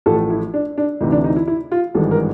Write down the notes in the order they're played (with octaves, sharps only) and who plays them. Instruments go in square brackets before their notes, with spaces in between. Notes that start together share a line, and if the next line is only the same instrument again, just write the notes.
[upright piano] A1 A2 F3 A3 A4
E4
D4
D4
D2 C3 E3 D#4
D4
D#4
E4
E4
F4
G#1 G2 E3 G#3 A4
A#4